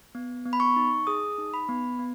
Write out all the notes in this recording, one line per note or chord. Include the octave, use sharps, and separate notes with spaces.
B3
B3
B5
C#6
D#4
G#4 D#6
D#4
B5
B3
B3